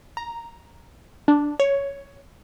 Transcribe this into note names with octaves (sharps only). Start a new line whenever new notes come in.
A#5
D4
C#5